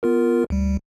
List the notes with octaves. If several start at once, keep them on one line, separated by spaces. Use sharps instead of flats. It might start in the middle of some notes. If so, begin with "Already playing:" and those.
B3 F4 A#4
D2 G3